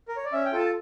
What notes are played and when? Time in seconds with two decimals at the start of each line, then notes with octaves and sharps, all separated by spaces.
0.08 A#4
0.17 C#5
0.25 D5
0.33 C#4 E5
0.45 G5
0.52 F4 A4
0.59 A5